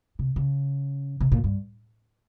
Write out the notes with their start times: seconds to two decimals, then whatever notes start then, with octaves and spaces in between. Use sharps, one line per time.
0.19 C3
0.36 C#3
1.20 C3
1.32 A#2
1.44 G2